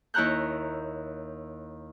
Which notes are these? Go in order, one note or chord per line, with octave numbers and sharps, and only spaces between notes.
D#2 E4 C#5 A#5 F#6 G6